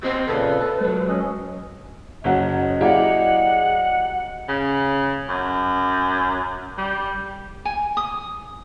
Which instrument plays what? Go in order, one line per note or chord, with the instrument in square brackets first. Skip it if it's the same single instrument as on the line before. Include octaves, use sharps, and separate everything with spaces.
[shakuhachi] C4 [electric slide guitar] G4 D#5
[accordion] A#2 C#3 A4 [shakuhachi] B4
[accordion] A4 [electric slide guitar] A5
[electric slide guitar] F#3 G#3
[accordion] C#4 D#5
[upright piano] F#1 F#3 F#5 [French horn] D#5
[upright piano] F#3 A#3 G4 [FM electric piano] E4 G#4 D5 [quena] F#5
[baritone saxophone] C#3
F#2
G3
[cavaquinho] G#5
D#6